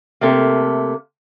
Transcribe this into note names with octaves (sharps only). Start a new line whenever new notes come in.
C3 A3 A#3